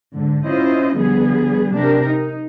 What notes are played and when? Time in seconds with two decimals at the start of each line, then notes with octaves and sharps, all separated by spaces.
0.16 G#2 D3
0.46 C#4 E4 F4 C5 D#5
0.97 D3 F3 G3 B3 G#4
1.74 C3 D4 G4 A#4
2.08 D#4